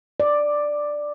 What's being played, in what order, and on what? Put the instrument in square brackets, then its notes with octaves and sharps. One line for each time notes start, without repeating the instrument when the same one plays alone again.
[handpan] D5